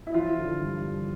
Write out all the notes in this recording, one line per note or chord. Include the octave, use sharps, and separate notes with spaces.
E4
F3 F4
D3
G2
G1